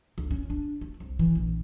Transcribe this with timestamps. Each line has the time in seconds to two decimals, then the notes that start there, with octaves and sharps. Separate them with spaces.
0.18 D2
0.31 C#4
0.50 D4
0.81 A3
1.00 C2
1.19 E3
1.35 A#1